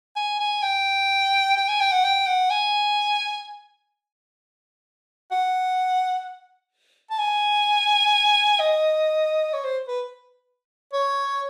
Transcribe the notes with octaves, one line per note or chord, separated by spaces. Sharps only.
G#5
G#5
G5
G5
G#5
G5
F#5
G5
F#5
G#5
F#5
A5
G#5
D#5
C#5
C5
B4
C#5